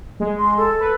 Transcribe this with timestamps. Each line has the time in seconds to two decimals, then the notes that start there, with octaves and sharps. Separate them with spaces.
0.20 G#3
0.38 C6
0.57 A4
0.80 B4